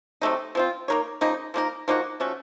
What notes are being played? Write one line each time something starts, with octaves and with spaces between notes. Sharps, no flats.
C3 F#3 A3 D#4
F3 C4 F4
A#3 D#4 A#4 C#5
C#3 F3 A#3 D#4
F3 A#3 D#4 A#4
F3 A#3 D#4 F#4
F3 A3 C#4 F#4